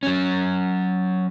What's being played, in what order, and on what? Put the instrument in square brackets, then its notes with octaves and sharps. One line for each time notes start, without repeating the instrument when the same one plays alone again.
[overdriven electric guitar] F#3 C#4